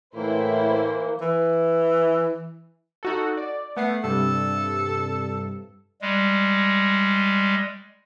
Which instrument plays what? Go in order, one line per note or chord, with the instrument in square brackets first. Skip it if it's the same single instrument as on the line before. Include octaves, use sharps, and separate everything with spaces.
[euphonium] A2 [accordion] E3 A#3 [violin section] E4 C5
[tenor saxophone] E3
[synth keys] D#4 F#4 A4
D5
[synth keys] A3 C7 [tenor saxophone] B3
[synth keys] G2 C3 [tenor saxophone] A4
[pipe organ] G3 G#3